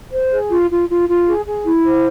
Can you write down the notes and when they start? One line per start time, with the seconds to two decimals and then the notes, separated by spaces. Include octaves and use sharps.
0.12 C5
0.32 G#4
0.50 F4
0.71 F4
0.90 F4
1.08 F4
1.27 G#4
1.46 G#4
1.65 E4
1.84 C5